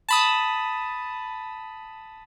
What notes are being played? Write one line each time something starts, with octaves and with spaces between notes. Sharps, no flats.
A5 B5 D#6